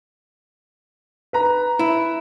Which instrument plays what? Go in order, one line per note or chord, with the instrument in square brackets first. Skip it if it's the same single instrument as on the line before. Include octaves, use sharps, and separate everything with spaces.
[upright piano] B4 A#5
[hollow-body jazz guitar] E4